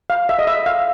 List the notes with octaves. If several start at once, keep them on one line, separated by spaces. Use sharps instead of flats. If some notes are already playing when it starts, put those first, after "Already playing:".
F5
E5
D#5
E5
F5